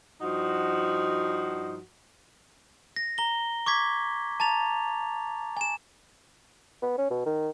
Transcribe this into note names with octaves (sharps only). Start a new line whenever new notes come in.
G2 F3 D#4 F#4
A#6
A#5 G7
C#6 D6 G#6 B6
A5 A#5 A6 F7
G#5 E7
B3
C#4
B2
D#3